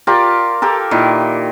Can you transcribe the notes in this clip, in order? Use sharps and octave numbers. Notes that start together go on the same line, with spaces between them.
F4 G4 A#4 D5
G4 A4 A#4
A#2 D#3 E4